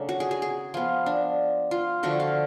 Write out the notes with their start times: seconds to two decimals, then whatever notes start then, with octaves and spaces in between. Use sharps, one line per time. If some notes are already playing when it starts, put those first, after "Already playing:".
Already playing: C#3 F#3 A3 D4
0.09 F#4
0.20 G#4
0.31 G#4
0.42 G#4
0.74 F3 B3 F4
1.06 D4
1.71 F4
2.03 D3 F3 A3 F#4
2.20 F5